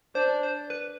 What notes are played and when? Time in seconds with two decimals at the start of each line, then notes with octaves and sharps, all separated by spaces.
0.15 D4 C5
0.43 C5
0.70 B4